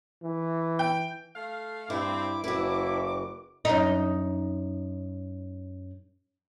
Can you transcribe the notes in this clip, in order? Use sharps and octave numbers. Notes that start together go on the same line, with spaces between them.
E3
G5
A3 F5
G2 C4 E4 D6
F#1 E4 F#4 B4
F#2 D#4